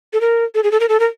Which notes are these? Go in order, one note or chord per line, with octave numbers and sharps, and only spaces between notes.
A4
A#4
A4
G#4
A4
A#4
A4
A#4